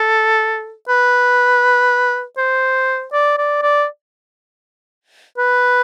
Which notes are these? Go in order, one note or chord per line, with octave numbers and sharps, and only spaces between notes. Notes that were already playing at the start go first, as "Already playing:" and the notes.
Already playing: A4
B4
C5
D5
D5
D5
B4